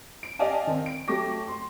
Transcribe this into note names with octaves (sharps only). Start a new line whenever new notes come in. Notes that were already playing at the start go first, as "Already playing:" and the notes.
D7
G4 D5 D#5 F5 G#5 A5
D#3 C4
D7
F#3 A3 G4 C#6 D6 A#6
C6